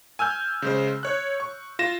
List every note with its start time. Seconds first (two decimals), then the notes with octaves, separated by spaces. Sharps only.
0.19 G#5 E6 F6 G6
0.62 C#3 G#3 C5
1.03 C#5 F#6
1.40 C#6
1.79 F4 A#6 E7